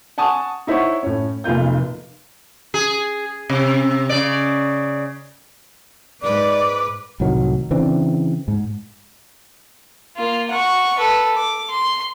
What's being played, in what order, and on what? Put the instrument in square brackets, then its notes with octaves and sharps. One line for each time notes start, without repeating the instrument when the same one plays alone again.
[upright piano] F#5 G#5 A5 C#6 D#6
D#4 E4 C5 C#5 F#5 C#6
A2 C#4
F1 B1 A#3 F4 G6
[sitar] G#4
C3
C#3 D5
[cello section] G#2 B4 [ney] D5 [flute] D6
[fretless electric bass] C2 A2 D#3 F#3
C#3 E3 C4 D4
G#2
[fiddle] A#3 F4
F#5 C#6
A4 B4
D6
C6